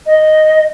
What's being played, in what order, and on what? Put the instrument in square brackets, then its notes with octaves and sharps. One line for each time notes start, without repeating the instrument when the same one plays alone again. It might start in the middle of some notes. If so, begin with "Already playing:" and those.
[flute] D#5